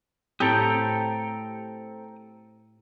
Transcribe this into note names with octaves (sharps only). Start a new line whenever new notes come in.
A2 C4 G4 A4 G5 A#5 D#6